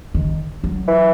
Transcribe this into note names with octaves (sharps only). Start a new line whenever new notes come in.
D#3
F#3
E3